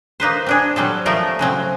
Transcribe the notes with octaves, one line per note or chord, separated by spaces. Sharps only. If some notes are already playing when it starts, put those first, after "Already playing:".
A#3 D#4 B4 C5
C4 D4 G#4
F#3 G3 C4 A4
F3 A3 F4 A#4
C#3 F#3 C4